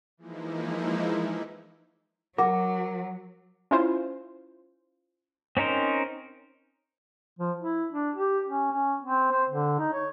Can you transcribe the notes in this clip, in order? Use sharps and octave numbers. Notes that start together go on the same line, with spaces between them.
E3 F3 G#3 A#3 D#4 E4
F#3 F#4 A#4 F#5 D6
C#4 E4 F4 C5
C4 C#4 D#4 A#4 C5
F3
E4
D4
G4
C#4
C#4
C4
C5
D3
D#4
C#5